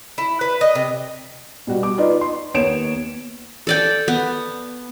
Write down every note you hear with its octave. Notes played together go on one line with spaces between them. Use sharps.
E4
B4
D#5
C3
B2 G3 F#4
D6
D#4 F4 B4 D5 D#5
C6
D#2 B3 C#5 D7 E7
A4 D5 G5
B3